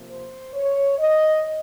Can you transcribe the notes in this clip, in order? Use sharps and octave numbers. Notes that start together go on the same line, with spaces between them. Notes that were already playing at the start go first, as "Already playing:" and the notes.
Already playing: C3 F3 A#3
C5
C#5
D#5